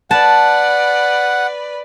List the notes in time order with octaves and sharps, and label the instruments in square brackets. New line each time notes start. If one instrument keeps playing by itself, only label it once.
[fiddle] B4 D5 [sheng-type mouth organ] F#5 [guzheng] A5